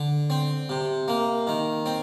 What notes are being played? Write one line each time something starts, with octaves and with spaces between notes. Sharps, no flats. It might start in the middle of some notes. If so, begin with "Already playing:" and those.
Already playing: D3
C4
C3
A#3
D#3
C4